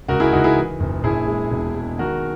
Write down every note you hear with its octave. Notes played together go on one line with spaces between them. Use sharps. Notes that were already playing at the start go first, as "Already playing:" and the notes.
C#2 F#4 A#4
E4 G#4
C#2 D#4 F#4
E4 G#4
E3
F#1
A#1 E4 G#4
G#3
E1
G#3
D#3 F#4 A#4